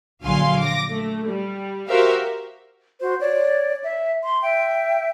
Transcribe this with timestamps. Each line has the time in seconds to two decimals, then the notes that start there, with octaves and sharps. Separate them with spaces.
0.23 A#1 D3 F#3 F5 G#5 C6
0.59 D6 A#6
0.91 A3
1.27 G3
1.89 F#4 G4 A#4 C5 E5 F5
2.99 F#4 C5
3.19 C#5 D5
3.83 E5
4.23 C6
4.41 E5 G5